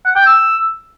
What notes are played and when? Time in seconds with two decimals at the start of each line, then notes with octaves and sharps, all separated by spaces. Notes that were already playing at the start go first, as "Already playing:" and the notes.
0.05 F#5
0.15 G5
0.26 E6